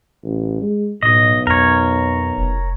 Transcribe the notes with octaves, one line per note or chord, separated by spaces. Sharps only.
A1
G#3
B1 A2 D#5
F2 A#4 C#5
F1